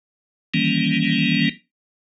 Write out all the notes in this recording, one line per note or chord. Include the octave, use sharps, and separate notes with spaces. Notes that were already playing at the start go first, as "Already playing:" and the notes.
D#3 E3 G3 A#3 C#4